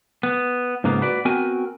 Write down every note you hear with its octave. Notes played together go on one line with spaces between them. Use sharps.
B3
G#2 C#3 A#3 B3 F4
F#4 B4 D5
B3 C4 F#4 A#4 G5 G#5